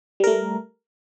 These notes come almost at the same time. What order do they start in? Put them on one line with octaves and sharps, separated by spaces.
G3 A#4 A3